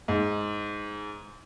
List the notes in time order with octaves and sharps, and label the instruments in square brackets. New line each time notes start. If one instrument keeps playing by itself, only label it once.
[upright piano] G#2